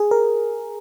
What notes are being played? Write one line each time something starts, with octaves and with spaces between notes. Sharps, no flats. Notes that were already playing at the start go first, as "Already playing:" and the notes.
Already playing: G#4
A#4